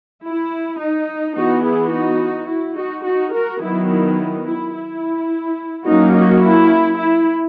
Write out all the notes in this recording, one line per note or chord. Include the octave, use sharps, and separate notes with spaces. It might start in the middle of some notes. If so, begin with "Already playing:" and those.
E4
D#4
E3 B3 D#4 F#4
E4 G#4
D#4 F#4
E4
D#4 F#4
D#4 F#4
F#4 A#4
D#3 F#3 B3 E4
E4
E4
E4
F#3 A#3 C#4 D#4 F#4
D#4 F#4
E4
E4